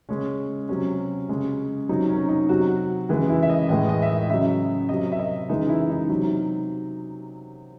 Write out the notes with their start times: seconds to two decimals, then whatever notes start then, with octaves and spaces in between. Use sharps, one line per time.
0.09 C#3 G#3 C#4
0.68 C3 F#3 C#4
1.29 C#3 G#3
1.89 C3 F#3 D#4
2.09 C#4
2.29 D#4
2.49 C3 F#3 F#4
3.09 C#3 E3 G#3 G#4
3.29 E4
3.43 E5
3.50 D#5
3.69 A2 E3 G#3 D#5
3.89 D#5
4.02 E5
4.10 D#5
4.29 C#3 F#3 E5
4.89 C3 F#3 D#5
5.12 E5
5.19 D#5
5.49 C#3 E3 G#3 D#4
5.69 E4
5.90 D#4
6.09 C3 F#3 D#4